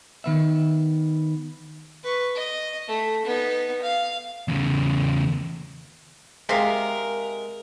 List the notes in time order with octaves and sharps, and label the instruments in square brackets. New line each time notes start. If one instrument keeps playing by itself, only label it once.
[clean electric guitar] D#3 B3 E5
[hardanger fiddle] B4 C#6
D#5
A3
B3 D#4
F5
[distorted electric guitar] E2 C#3
[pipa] C3 F5 [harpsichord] G#3 [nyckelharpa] A#4